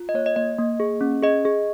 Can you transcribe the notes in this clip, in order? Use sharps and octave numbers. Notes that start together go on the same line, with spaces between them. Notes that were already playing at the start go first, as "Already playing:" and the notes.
Already playing: F4
D#5
A#3 C#5
D#5
A#3 D#5
A#3
G#4
C#4
G#4 D#5
G#4